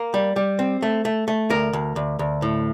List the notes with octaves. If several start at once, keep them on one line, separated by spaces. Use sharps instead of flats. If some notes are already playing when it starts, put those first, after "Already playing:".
Already playing: A#3
G3
G3
C4
A3
A3
A3
D2 A#4
D2
D2
D2
A2